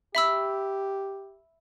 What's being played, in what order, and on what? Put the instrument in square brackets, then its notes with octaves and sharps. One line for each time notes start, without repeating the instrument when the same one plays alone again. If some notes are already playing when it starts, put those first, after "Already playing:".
[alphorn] G4 [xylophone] E5 B5 E6